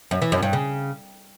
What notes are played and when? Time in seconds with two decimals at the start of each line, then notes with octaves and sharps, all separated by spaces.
0.11 F#2
0.22 E3
0.32 F#2
0.42 G2
0.53 C#3